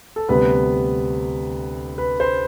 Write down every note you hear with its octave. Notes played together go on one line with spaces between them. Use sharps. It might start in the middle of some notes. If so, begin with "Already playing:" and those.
A4
D2 C3 G3 B3 B4
B4
C5